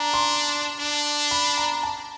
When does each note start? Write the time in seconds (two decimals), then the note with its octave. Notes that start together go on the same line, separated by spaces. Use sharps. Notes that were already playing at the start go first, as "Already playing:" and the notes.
Already playing: D4 A#5
0.14 C6
0.80 D4
1.31 B5
1.58 A#5
1.83 A5